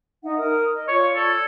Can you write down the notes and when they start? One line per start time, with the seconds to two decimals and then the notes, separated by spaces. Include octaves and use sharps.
0.22 D#4 E5 F#5
0.36 A#4 D#6
0.74 D#5
0.88 F4 C#5 D5
1.16 A4 D5 G#6